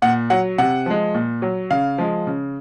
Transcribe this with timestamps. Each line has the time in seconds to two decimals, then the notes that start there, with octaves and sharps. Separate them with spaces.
0.02 A#2 F#5
0.30 F#3 F#5
0.58 C3 F#5
0.86 F3 G#3
1.14 A#2
1.42 F#3
1.71 C#3 F5
1.98 F3 G#3
2.27 C#3